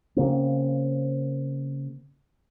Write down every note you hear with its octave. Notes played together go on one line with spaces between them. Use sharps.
C#3 A#3 C4